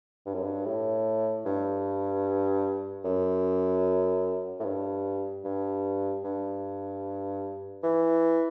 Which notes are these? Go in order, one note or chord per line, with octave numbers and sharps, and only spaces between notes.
G2
F#2
G2
A2
G2
F#2
A2
G2
G2
G2
E3